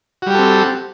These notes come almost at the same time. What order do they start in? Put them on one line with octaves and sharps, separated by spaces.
F#4 G3 G4 A4 C4